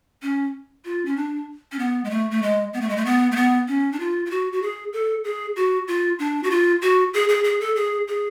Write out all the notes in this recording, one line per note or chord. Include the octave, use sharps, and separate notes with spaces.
C#4
F4
C#4
D4
C#4
B3
G#3
A3
A3
G#3
B3
A3
G#3
A3
B3
A3
B3
C#4
D4
F4
F4
F#4
F#4
G#4
A4
G#4
F#4
F4
D4
F#4
F4
F#4
G#4
G#4
G#4
A4
G#4
G#4